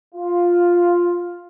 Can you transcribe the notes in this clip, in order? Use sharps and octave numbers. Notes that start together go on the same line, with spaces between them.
F4